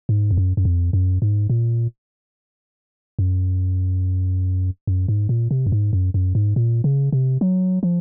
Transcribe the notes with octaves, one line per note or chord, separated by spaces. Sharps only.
G#2
F2
F#2
F#2
F2
F#2
G#2
A#2
F#2
F#2
G#2
A#2
C3
F#2
G#2
F#2
F#2
G#2
A#2
C#3
C3
F#3
F3